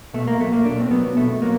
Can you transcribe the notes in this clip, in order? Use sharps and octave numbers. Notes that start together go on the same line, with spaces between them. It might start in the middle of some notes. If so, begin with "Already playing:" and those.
B2 A3
A#3
F#3 A3
A#3
B2 D4
C4
F#3 B3
B2 A3
F#3 A#3